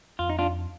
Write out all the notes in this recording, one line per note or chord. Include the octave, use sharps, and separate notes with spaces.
F2 F4
D#4
D4 F4